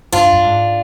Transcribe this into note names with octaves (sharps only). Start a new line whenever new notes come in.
G2 D4 F4
G2
G#2